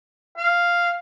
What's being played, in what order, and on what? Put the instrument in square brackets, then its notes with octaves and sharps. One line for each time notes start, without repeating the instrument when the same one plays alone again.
[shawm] F5